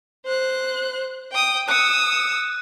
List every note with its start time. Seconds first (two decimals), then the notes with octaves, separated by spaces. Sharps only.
0.25 C5 F#6
1.32 G5 D#6
1.68 D#6 E6 F#6 C#7